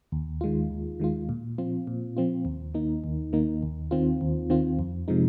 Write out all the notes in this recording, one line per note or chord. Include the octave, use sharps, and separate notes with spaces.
D#2
D#3 G#3 F4
D#2
D#3 G#3 F4
A#2
F3 C4 F4
A#2
F3 C4 F4
D#2
D#3 A#3 D#4
D#2
D#3 A#3 D#4
D#2
D#3 C4 F4
D#2
D#3 C4 F4
F2
C3 F3 G#3 D#4